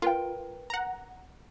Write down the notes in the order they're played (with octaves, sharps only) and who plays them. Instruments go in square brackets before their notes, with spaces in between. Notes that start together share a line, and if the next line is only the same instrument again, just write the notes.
[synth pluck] F4 [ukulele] A#4 B4 G5
[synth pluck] F#5 A#5